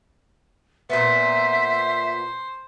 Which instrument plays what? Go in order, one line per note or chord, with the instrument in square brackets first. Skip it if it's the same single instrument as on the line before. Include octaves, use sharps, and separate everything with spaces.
[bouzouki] A#2 B3 [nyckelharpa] C5 [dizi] E5